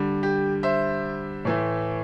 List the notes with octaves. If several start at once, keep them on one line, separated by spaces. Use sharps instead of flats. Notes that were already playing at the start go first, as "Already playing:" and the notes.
Already playing: D3 G3
G4
C5 E5
A2 E3 A3